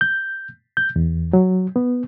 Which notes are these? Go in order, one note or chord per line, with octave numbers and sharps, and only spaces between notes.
G6
G6
E2
F#3
B3